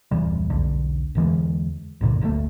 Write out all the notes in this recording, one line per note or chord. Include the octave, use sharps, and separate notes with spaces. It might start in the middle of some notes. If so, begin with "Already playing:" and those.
D1 F2 E3 G3
E1 B1 D3
E2 D3 E3 G#3
C#2 G2 A#2 D3
F#1 D2 C#3 A3